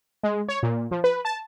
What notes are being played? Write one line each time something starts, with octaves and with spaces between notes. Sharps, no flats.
G#3
C#5
A#2
F3
B4
A5